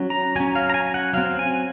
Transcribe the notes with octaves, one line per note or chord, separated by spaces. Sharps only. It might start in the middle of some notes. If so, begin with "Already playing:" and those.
Already playing: F#3 C#4
A#5
F#3 C#4 G#5
F5
A#5
G#5
F#5
F#3 C4 F5
G#5